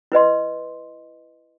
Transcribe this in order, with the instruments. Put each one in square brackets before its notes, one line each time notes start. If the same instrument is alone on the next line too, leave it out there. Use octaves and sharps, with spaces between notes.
[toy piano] E4 B4 D#5 C6